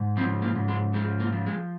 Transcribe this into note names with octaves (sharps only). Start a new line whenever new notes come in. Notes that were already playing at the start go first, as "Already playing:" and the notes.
Already playing: G#2
F3 C4
A#3
G#2
G#3
F3 G#3
A#3
F3
G#3